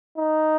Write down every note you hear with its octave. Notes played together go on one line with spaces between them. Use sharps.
D#4